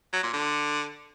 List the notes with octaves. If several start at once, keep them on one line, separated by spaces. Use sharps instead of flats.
F#3
A#2
D3